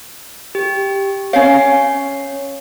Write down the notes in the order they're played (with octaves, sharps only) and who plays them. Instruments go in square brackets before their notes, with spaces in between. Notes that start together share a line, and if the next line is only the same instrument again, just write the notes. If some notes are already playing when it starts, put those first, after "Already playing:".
[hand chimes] G4
[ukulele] C#4 F5 [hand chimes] C#5 C7